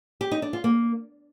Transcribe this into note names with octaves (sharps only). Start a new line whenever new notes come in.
G4
D#4
D4
F4
A#3